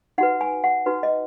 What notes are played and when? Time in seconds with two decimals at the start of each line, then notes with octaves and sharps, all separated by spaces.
0.18 D#4 F#4 B4 F#5
0.41 G#5
0.64 F#5
0.86 D#4 F#4 B4
1.03 D#5